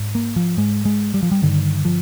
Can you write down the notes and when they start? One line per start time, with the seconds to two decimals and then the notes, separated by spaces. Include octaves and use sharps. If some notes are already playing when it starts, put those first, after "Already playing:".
Already playing: G#2
0.15 A#3
0.36 F3
0.57 G#2 G#3
0.85 G#3
1.14 G3
1.23 F3
1.32 G3
1.42 G2 D3 D#3
1.85 F3